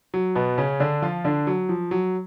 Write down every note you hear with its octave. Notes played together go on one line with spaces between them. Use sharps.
F#3
B2 B3
C#3 C#4
D3 D4
F3 F4
D3 D4
F#3
F3
F#3